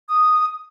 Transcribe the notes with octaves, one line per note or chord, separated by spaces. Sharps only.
D#6